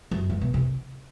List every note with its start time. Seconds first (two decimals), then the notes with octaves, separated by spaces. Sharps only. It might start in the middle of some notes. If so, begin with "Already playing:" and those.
0.11 F#2
0.30 G2
0.41 B2
0.54 C3